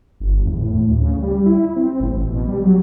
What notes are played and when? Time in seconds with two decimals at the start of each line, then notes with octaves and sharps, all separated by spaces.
0.20 G1
0.46 E2
0.60 A2
0.87 D2
1.02 C#3
1.22 G3
1.46 E4
1.76 C4
2.00 A1
2.27 B2
2.47 G3
2.63 F#3